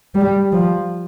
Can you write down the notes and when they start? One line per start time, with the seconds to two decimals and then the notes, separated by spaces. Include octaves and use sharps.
0.15 G3
0.53 F3